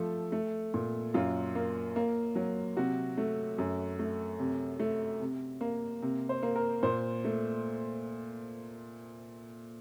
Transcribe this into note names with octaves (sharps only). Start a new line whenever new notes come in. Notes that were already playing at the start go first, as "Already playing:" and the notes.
Already playing: F3 A3 A4
A3
A#2
F#2 F4
A#3
A#3
F#3
C3 F#4
A3
F#2
A3
C3
A3
C3
A#3
C3
C5
A#3
A#4
A#2 C5
A3